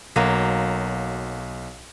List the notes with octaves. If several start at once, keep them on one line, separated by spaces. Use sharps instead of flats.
B1 F#3 A#3